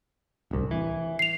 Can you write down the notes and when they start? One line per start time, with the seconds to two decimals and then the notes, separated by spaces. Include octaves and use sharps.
0.51 D1 C2
0.71 E3
1.19 C7 F7